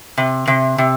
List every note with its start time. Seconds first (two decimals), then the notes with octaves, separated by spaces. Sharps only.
0.18 C3
0.48 C3
0.78 C3